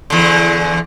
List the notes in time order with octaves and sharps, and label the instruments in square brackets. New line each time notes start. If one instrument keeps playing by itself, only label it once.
[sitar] E2 D3